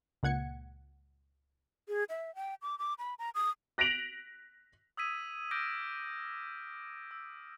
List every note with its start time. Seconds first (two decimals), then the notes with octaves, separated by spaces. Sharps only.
0.23 C#2 A#2 F#5 G#6 C#7
1.89 G#4
2.09 E5
2.35 G5
2.62 D6
2.79 D6
2.99 B5
3.19 A#5
3.35 D#6
3.78 F#6 A#6 B6 D7 F7 F#7
4.97 D#6 E6 G#6 B6 D#7
5.51 D6 F6 G6 A#6 D7 D#7
7.11 E6